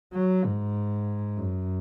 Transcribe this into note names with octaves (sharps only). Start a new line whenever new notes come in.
F#3
G#2
F#2